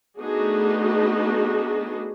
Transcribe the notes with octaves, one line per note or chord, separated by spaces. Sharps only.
A3 B3 D4 D#4 F#4 G#4